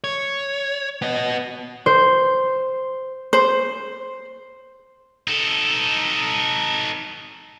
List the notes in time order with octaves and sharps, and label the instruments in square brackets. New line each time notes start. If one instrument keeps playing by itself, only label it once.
[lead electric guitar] C#5
B3 D#5
[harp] C5
[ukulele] C5
[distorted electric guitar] D#4 A4